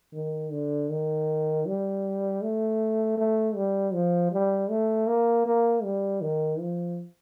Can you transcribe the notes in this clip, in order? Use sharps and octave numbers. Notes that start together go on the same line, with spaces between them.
D#3
D3
D#3
G3
A3
A3
G3
F3
G3
A3
A#3
A#3
G3
D#3
F3